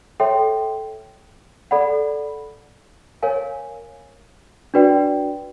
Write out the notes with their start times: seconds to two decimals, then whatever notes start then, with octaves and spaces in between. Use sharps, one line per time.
0.20 A4 C#5 E5 G5 C6
1.71 A4 D5 F#5 B5
3.23 A#4 C#5 F5 G#5
4.74 D4 F#4 B4 D5 G5